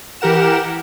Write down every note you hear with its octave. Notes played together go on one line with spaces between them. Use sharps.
E3 G4 A#4 F#5 E7